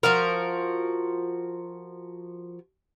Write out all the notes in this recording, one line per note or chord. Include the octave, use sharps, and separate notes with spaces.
F3 F#4 A#4